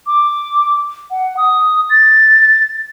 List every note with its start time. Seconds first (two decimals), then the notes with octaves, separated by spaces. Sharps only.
0.07 D6
1.11 F#5
1.37 D#6
1.90 A6